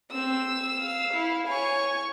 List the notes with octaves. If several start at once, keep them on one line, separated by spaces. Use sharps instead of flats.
C4 E6
F5
E4
C#5 G#5 C#6